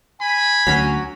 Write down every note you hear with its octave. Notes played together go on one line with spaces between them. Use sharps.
G#5 B5
D2 F#3 C#4